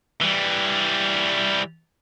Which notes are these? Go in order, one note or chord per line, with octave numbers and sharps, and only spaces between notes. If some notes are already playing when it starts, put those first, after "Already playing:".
E3 G3